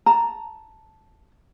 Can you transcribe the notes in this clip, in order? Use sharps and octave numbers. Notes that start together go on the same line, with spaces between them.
A5 A#5